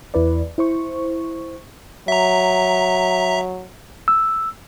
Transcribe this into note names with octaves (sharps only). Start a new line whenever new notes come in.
E2 E4 B4 D5
E4 C5 C#6
F#3 E5 A#5
E6